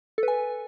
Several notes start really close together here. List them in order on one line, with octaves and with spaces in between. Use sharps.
A4 B4 G#5